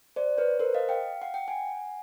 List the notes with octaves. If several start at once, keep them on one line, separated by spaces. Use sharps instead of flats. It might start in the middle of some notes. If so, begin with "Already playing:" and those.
C5 D5
B4 C#5
A#4 C5
D#5 F5
F5 G5
F#5
G5
F#5 G#5